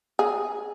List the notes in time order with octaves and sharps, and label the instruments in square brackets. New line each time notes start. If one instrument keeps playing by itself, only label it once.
[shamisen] G#4